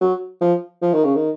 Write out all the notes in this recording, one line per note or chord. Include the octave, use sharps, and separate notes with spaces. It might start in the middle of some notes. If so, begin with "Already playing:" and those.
F#3
F3
F3
D#3
C#3
D#3